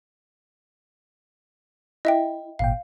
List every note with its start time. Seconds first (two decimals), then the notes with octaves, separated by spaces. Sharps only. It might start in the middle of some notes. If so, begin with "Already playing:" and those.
2.05 E4 D#5 E5 G5
2.59 G#1 A#2 F5 G5